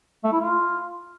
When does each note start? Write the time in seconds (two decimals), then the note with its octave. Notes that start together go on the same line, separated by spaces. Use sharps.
0.24 A3
0.32 E4
0.41 F4